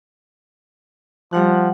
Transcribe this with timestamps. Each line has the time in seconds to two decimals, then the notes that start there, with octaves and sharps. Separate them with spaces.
1.33 F3 G3 F#5 F#6